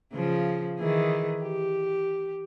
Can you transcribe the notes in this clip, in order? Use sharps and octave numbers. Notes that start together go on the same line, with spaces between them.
C#3 F3
D#3 E3 G#4
G4